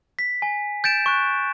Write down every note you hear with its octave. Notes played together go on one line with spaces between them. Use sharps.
B6
G#5
G6 A6 D7 E7
C#6 F#6